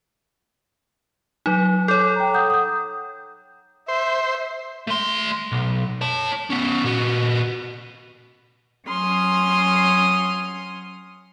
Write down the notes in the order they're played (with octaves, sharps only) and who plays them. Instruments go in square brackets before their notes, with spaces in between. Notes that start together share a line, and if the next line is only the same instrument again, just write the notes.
[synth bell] F#3 D#4
[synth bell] A4 C#5 [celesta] D6 G6
[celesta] G5 A#5
F#5 D#6 G6
D#6 G6
[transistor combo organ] C5 [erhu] E5
[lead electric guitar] A3 C6
B1
C#5 A5
B3 C#4
A#2 F#4
[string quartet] F#3 C#4 C6 D#6 F6